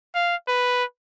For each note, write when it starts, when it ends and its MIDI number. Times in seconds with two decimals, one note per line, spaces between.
0.15 0.35 77
0.48 0.84 71